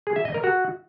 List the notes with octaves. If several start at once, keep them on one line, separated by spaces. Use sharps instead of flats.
G#4
E5
D#5
A#4
F#4